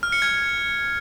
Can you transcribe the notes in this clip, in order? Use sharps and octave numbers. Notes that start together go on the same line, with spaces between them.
F6
C#7
G#6